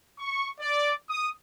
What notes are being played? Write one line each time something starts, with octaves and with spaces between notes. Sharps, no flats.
C#6
D5
D#6